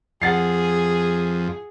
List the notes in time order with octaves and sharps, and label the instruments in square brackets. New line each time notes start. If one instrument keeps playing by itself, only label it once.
[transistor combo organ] F2 [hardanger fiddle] G#4 [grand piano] F#5 A6 C7